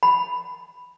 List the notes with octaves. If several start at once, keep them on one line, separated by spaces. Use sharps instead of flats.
B5